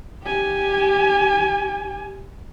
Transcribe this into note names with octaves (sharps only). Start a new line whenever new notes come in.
G4 G#5